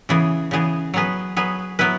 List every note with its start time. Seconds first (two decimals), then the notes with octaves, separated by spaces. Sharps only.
0.09 C#3 E3 B3 G#4
0.51 C#3 E3 B3 G#4
0.94 F#3 B3 G#4 B4
1.37 F#3 B3 G#4 B4
1.79 F#3 B3 E4 B4